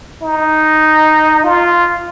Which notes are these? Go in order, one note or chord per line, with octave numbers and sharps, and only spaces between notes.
D#4
F4